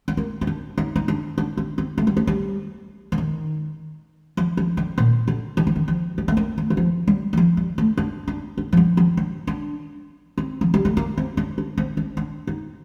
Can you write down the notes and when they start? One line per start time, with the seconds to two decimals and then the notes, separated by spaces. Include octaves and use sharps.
0.08 C4
0.17 A#3
0.41 C4
0.47 D4
0.78 D#4
0.96 D#4
1.08 D4
1.38 D4
1.57 C4
1.78 C4
1.98 A3
2.07 G3
2.17 A3
2.27 G3
3.12 D3
3.18 D#3
4.37 F3
4.57 F3
4.77 D3
4.98 A#2
5.28 D3
5.57 D#3
5.67 F3
5.76 D#3
5.88 F3
6.18 G3
6.28 A3
6.37 A#3
6.58 A3
6.70 D#3
6.77 F3
7.08 G3
7.33 G3
7.37 F3
7.57 G3
7.78 A3
7.97 D4
8.28 D4
8.58 D4
8.73 F3
8.77 G3
8.97 F3
9.17 D4
9.47 D4
10.38 C4
10.61 F3
10.74 G3
10.85 A3
10.97 A#3
11.18 C4
11.37 D4
11.58 D4
11.78 C4
11.97 D4
12.17 D4
12.47 D#4